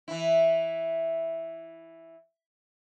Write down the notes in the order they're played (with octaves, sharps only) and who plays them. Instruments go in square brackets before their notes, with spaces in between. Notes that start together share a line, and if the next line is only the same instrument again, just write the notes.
[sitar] E3 E4